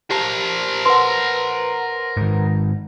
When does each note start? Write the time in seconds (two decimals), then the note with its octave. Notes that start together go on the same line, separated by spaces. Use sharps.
0.10 G4 A#4 C5 A5
0.86 B4 F#5 C6
2.17 G#2 D#3